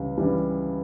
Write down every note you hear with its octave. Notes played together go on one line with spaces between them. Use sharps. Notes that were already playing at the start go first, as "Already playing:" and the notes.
Already playing: C#2 C#3 E3 G3
C#3 E3 G3